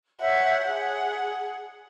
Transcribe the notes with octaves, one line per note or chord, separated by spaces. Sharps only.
C#5 E5 F#5 G6
G#4 F#5